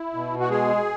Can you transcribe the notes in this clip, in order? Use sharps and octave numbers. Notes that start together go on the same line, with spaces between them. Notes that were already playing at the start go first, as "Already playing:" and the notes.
Already playing: E4
B2
F#4
G#3 G#4